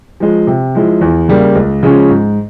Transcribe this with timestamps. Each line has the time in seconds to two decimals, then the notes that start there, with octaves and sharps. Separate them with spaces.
0.20 F3 G#3
0.47 C3
0.75 F3 G#3 E4
1.01 E2
1.28 C#3 G3 A#3
1.55 C#2
1.83 C#3 F3 G#3 C#4
2.09 G#2